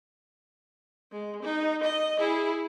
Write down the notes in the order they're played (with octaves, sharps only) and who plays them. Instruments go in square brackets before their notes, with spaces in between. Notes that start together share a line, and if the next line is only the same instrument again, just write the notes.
[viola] G#3
D#4
D#5
E4 G#4